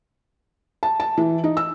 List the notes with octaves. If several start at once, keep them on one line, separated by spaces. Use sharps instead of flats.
A5
A5
E3
D#4
E6